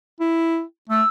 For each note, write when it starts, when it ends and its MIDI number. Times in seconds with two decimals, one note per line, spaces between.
0.20 0.62 64
0.89 1.02 57
0.89 1.09 88